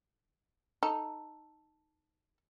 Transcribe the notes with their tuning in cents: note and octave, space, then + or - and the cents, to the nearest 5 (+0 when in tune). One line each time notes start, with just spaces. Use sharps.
D#4 +0 A4 +0